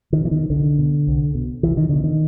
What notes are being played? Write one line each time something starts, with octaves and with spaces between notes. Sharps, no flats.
D#3
B2 E3
D#3
C2 D3
B2
C2
B2
C2 E3
D#3
B2 D3
D#3